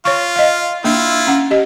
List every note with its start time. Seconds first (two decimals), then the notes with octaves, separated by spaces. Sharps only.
0.05 F4 C#5 C#6
0.36 D#5 F5
0.84 A#3 D4 E4 F4
1.27 C#4 F#5
1.51 G4 D#5